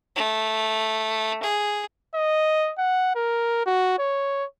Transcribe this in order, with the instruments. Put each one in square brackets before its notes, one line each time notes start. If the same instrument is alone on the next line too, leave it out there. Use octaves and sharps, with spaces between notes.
[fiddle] A3
G#4
[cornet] D#5
F#5
A#4
F#4
C#5